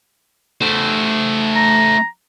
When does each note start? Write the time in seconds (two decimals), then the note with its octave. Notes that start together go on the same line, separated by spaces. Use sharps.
0.62 A3 C5
1.56 A#5